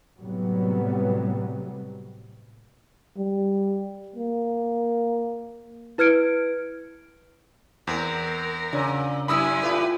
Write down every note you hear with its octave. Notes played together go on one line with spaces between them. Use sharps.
A2 C3 F#3 G3 B3
G3
A#3
E4 B4 F6 G#6 C#7 D7
E2 C4 A#4
A#2 C#3 C#4 D4
F#2 E4 G#5 B5 D#6 E6
A2 F4 G4 B4 D5